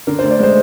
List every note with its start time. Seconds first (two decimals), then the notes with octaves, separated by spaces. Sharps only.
0.07 D3 A#4
0.19 C5
0.23 D2
0.31 D5
0.39 G#3 C5